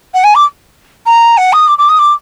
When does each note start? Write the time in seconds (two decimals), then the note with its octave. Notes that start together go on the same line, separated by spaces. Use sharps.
0.14 F#5
0.24 G#5
0.35 D6
1.06 A#5
1.37 F#5
1.53 D#6
1.67 D6
1.78 D6
1.89 D#6
1.99 D6